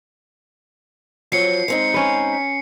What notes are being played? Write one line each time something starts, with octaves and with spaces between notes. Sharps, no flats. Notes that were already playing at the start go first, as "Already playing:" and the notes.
F2 F#3 C4 C7 C#7
G#3 C4 D#4
C#4 B4
B6